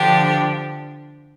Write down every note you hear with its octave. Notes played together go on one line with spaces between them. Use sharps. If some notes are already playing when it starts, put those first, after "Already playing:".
Already playing: D3 F3 D4 G4